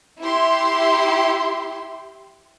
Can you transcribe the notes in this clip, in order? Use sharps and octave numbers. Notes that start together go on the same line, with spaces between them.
E4 G4 E5 C6